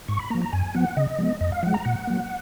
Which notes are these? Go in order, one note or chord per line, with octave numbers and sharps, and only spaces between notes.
G#2 C#6
B5
F3 A#3 A#5
A#5
F#2 G#5
F3 B3 F#5
C#3 D#5
F3 G#3 B3
F2 D#5
F5
F3 G#3 F#5
A#5
A#2 F#5
F#3 A#3